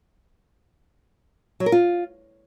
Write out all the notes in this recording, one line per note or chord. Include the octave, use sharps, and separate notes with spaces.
F#3
A#4
F4